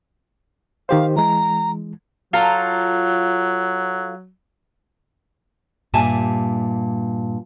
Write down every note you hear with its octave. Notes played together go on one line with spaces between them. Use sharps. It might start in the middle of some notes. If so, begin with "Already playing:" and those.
D#3 G4 C5 F5
E3 G#3 A#5
F#3 F4 A4 A#5
G2 A#2 G3 E5 G#5 A5